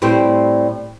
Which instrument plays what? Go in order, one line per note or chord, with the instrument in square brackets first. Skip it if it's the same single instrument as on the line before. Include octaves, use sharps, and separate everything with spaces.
[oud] A2 G3 C4